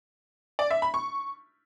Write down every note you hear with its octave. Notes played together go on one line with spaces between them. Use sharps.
D5
E5
B5
C#6